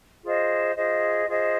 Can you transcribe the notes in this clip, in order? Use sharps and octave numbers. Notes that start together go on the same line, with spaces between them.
F4 G#4 C5 D#5
F4 G#4 C5 D#5
F4 G#4 C5 D#5